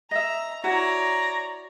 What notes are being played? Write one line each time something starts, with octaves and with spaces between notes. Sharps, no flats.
D#5 E5 A#5
E4 F#4 C#5 D5 A#5